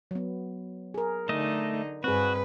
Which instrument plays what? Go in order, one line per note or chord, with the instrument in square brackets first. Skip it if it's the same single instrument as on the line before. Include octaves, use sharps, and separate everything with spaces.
[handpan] F#3 B3
G#4 A#4
[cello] D3 D#4 [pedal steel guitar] A3 D#5
[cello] G2 B4 [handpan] C4 G#4 [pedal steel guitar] F#4